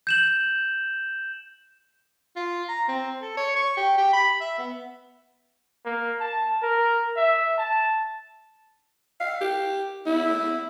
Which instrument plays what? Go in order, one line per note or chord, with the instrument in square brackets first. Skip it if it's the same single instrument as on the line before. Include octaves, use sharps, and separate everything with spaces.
[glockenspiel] G6 E7 F#7
[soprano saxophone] F4
A#5
C4
A4
C#5
C#6
G4
G4
B5
E5
B3
[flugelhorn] A#3
A5
A#4
E5
A5
[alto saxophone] F5
G4
E4